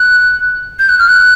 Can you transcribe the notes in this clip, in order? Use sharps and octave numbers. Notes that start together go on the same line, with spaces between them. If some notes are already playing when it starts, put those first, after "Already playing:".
Already playing: F#6
G6
F#6
F6
F#6